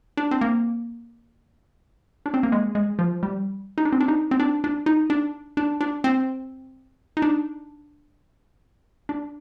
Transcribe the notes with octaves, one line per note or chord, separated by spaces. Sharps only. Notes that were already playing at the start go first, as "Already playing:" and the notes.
D4
C4
A#3
D4
C4
A#3
G#3
G#3
F3
G3
D#4
D4
C4
D4
D#4
C4
D4
D4
D#4
D4
D4
D4
C4
D#4
D4
D4